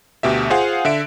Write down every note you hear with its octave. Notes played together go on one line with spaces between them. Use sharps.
D2 B2 G4 E5
F4 G#4 C5 F5 F#5
D3 E5 D7